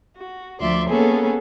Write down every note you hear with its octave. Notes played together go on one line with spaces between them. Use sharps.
F#4
D2 F3 D5 E5 C6
A#3 B3 C#4 G#4 A4